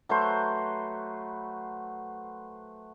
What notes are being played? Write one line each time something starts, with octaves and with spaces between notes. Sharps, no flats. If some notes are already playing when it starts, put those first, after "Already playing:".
F#3 A3 B4 C5